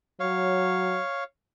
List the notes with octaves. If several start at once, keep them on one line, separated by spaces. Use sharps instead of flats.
F#3 C#5 F5